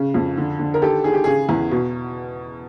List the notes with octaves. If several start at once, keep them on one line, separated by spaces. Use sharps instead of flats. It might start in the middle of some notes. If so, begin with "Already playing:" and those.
Already playing: C#3
F2
D3
D3
A#4
D#3 G4 A4
D#3 G#4
G4
C#3 G#4
E2
B2